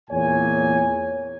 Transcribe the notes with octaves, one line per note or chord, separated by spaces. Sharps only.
E2 A#2 C#5 G#5